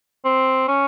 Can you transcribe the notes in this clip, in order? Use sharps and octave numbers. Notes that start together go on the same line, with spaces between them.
C4
C#4